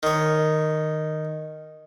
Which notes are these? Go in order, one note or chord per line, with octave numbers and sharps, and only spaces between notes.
D#3 C#5